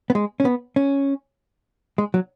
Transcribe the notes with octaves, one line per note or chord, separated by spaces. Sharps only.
B3
G#3
C#4
B3
C#4
G#3
F#3